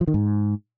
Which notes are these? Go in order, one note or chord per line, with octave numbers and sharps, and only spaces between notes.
F3
D#3
G#2